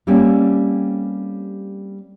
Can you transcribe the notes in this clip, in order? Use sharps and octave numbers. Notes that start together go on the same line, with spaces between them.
G3 A3 A#3 C4 C#4 G4